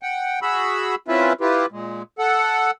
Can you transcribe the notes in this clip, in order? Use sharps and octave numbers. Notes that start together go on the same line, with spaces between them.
F#5 G5
F#4 G#4 B5 E6
C4 C#4 E4 F4 B4 E5
E4 F4 G4 B4
A#2 G#3
A4 F#5